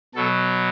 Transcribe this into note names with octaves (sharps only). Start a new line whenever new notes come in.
B2 F#3 A4